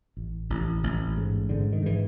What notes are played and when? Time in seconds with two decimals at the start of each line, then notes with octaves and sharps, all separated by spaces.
0.17 A1
0.50 A1
0.83 A1
1.17 G#2
1.49 G#2 D3
1.73 D#3
1.83 G#2 E3